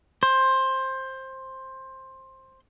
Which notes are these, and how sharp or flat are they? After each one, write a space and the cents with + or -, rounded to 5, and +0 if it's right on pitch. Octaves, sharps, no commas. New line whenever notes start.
C5 +15